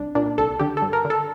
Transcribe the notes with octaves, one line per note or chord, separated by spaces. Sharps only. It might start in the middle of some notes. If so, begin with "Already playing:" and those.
Already playing: C2 D4
A#2 D4
C2 A4
D3 G4
G2 A4
A#4
D3
A4